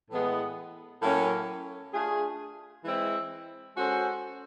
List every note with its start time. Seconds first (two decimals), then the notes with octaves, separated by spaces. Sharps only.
0.11 A2 E3 G#3 B3
1.02 A2 F#3 A#3 C#4
1.93 A3 D4 F4 G#4
2.85 E3 G#3 C4 E4
3.76 G#3 C#4 F#4 A4 C5